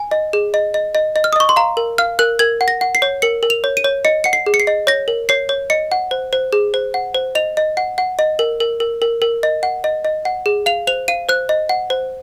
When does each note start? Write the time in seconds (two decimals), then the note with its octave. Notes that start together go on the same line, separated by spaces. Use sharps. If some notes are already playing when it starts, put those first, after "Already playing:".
Already playing: G#5
0.11 D#5
0.33 G#4
0.54 D#5
0.74 D#5
0.95 D#5
1.16 D#5
1.24 F6
1.33 D#6
1.36 D#5 C#6
1.49 C6
1.56 F5 A#5
1.77 A#4
1.98 F5 F6
2.19 A#4 F#6
2.39 A#4 G#6
2.61 F#5
2.68 A#6
2.81 F#5
2.95 C7
3.02 C#5
3.22 A#4 C#7
3.43 A#4
3.50 F7
3.64 C#5
3.77 D#7
3.84 C#5
4.05 D#5 C#7
4.24 F#5 C#7
4.33 C7
4.46 G#4
4.54 C#7
4.60 C7
4.67 D#5
4.87 C#5 A#6
5.08 A#4
5.29 C#5 C7
5.49 C#5
5.70 D#5 C#7
5.92 F#5
6.11 C5
6.33 C5
6.53 G#4
6.74 C5
6.94 F#5
7.14 C5
7.35 D#5 F7
7.57 D#5
7.77 F#5
7.98 F#5
8.19 D#5
8.39 A#4
8.60 A#4
8.80 A#4
9.02 A#4
9.22 A#4
9.43 D#5
9.63 F#5
9.84 D#5
10.05 D#5
10.25 F#5
10.46 G#4
10.66 F5 F7
10.87 C5 F7
11.08 F5 D#7
11.29 C5 F#6
11.49 D#5
11.69 F#5
11.90 C5